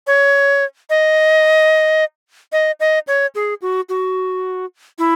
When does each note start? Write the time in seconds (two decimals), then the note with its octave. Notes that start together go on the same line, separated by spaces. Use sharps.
0.07 C#5
0.90 D#5
2.52 D#5
2.80 D#5
3.07 C#5
3.35 G#4
3.62 F#4
3.89 F#4
4.98 E4